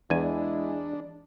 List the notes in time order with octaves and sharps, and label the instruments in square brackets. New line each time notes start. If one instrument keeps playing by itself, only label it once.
[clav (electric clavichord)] E2 G#5 [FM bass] E3 [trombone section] G#3 E4 G#4 [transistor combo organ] D4